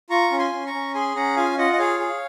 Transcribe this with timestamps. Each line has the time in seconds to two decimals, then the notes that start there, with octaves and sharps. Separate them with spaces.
0.10 F4 A#5 C#6
0.31 C#4
0.38 G#5 C6
0.53 C#4
0.66 A#5 C#6
0.73 C#4
0.94 G#4 G#5 C6
1.15 C#4 F#5 A#5
1.36 F4 F5 G#5
1.58 F4 D#5 F#5
1.73 D#5
1.78 G#4 C#5 F5
1.99 G#4